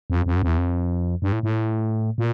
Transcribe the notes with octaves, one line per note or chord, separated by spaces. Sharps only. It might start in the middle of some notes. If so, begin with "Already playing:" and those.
F2
F2
F#2
F2
E2
F2
G2
A2
A2
A#2